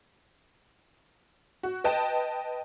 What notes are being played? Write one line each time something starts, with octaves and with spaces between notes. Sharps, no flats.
F#4
B4 D#5 G5 A5